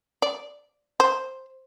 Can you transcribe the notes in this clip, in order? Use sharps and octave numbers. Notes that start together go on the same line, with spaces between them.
D5
C5